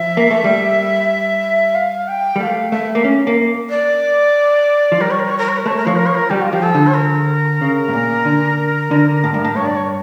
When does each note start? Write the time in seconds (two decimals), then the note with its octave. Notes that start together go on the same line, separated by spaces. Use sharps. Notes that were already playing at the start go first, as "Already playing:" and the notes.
Already playing: F3 E5
0.17 A#3
0.31 A3
0.44 G3
1.75 F5
2.08 G5
2.36 G3
2.40 A3 F5 G5
2.72 A3 E5
2.95 A#3
3.04 C#4
3.27 A#3
3.70 D5
4.92 F3
5.00 G3 A#4
5.10 C#5
5.19 A#4
5.29 C#5
5.38 A#4
5.48 C#5
5.57 A#4
5.66 A3 C#5
5.77 A#4
5.86 F3 C#5
5.96 A#4
6.06 C#5
6.15 A#4
6.30 G3 G4
6.42 F4
6.52 F3 G4
6.62 A4
6.75 D3
6.87 C#5
6.95 A#4
7.61 C#3
7.88 A2
7.94 A#2
8.25 D3
8.91 D3
9.24 A2
9.34 G2
9.44 A2
9.56 G2 C#5
9.65 D5
9.76 C#5